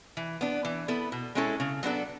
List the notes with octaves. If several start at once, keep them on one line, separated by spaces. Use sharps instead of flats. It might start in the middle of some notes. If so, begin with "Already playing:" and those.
E3
B3 D4
E3
B3 E4 A4
B2
G#3 C#4 E4 A4
C#3
F#3 B3 D4 A4